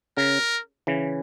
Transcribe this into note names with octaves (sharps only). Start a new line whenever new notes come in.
C#3 A#4
C#3 E3